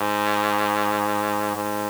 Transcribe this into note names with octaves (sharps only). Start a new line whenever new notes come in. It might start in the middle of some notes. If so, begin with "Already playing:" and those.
Already playing: G#2
G#2